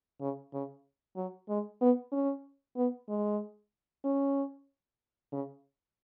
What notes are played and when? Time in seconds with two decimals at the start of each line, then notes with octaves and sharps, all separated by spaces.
0.21 C#3
0.53 C#3
1.16 F#3
1.49 G#3
1.81 B3
2.12 C#4
2.77 B3
3.09 G#3
4.04 C#4
5.32 C#3